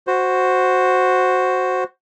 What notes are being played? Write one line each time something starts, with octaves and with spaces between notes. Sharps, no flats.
F#4 C5